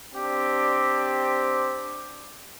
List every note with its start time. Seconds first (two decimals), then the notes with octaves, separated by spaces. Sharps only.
0.14 C4 D4 G4